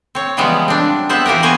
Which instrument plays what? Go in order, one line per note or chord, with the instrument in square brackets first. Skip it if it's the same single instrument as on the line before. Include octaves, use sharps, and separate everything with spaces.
[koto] C4 C#5
C#3 E3 F3 G3 G#3 B3
C4 D4
B3 C4 C5 E5 F#5
E3 A#3 F4 G4 A#4
B3 F#4 C5 G#5 A#5